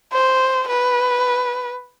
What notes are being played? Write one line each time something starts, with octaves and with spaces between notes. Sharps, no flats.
C5
B4